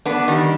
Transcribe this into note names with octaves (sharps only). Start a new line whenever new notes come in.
B3 D4
D#3 G3